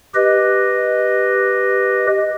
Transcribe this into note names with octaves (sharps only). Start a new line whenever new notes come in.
G4 B4 D#5